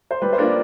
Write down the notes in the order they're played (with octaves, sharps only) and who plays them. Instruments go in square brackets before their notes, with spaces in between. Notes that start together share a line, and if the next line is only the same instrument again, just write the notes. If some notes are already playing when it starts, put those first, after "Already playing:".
[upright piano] C5
[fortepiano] G3 [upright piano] B4
[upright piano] C5
[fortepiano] A#3 D4 F4
[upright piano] D5